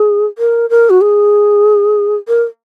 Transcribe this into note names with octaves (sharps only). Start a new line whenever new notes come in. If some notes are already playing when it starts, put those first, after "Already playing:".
Already playing: G#4
A#4
A#4
F#4
G#4
A#4